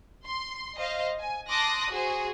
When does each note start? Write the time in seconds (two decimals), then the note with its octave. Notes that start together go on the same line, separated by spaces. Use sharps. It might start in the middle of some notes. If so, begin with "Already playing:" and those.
0.24 C6
0.76 C5 D#5 F5
1.19 G#5
1.49 A5 C6 D6 D#6 F#6 A#6
1.89 F#4 G#4 C5